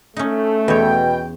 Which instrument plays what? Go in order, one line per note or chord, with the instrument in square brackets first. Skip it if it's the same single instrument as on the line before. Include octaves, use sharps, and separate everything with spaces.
[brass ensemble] A3 [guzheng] C#4 D#4
[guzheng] E2 C#5 [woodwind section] B2 G5